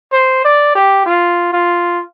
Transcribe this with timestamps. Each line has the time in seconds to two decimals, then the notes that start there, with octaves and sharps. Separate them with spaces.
0.12 C5
0.44 D5
0.75 G4
1.06 F4
1.53 F4